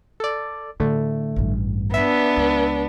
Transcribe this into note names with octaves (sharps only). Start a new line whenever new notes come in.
A4 D5
A2 D3 A3
A1 G2
B3 D4 E5
C#2